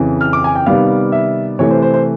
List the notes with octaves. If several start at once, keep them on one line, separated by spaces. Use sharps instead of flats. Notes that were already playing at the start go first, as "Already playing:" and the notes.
Already playing: F2 C#3 E3
F6
D6
G#5
G5
C3 D#3 G3 B3 F5
E5
C3 E3 A3 C#5
C5
C5
C5